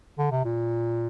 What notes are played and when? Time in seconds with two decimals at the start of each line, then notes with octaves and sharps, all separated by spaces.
0.18 D3
0.31 C3
0.45 A#2